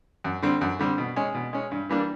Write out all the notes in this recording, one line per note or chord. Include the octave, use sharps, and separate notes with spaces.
F#2
D3 G3 C4
F#2
D3 G3 C4
B2
G#3 C#4
B2
G#3 C#4
G2
E3 G3 A#3 D4